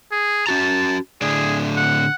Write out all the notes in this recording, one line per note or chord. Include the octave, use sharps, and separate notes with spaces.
G#4
C#4 F#4 A5 A#5
A2 D3 G#4 D5
F#5